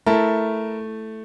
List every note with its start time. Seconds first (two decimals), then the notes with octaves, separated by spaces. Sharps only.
0.06 A3 E4 A#4 A5